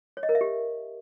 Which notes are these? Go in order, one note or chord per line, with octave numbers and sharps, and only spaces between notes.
C#5
D#5
A#4
E5
G4